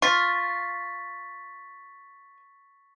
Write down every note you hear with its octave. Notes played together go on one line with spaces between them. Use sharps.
F4 C#6 A6 B6